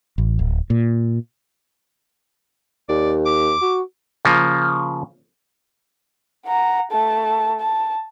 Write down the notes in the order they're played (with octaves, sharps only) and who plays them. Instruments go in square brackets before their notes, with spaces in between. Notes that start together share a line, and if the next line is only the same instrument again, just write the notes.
[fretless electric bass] A1
D1
A#2
[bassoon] D#2 [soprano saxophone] D5
[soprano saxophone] D6
[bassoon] F#4
[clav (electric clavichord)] C#3 F3 A#3
[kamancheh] F#5 A#5
A3 A5
A5